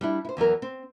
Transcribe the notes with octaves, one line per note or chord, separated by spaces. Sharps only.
G3 D4 E4
E4 C5
E2 E3 F#3 A#4
C4